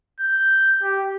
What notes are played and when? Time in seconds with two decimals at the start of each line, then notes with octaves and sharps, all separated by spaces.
0.20 G6
0.83 G4